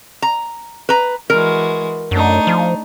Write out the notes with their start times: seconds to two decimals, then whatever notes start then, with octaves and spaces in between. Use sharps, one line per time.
0.22 A#5
0.89 B4 A#5
1.30 E3 G#3 F#4 A#4
2.11 F#2 A3 D4 D#4
2.47 F3